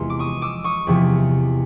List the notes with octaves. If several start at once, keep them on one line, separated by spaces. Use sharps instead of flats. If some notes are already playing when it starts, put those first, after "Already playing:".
Already playing: E2 C3 F3 G#3 C6
D6
C#6 D#6
D6 E6
C#6 D#6
E2 C3 F3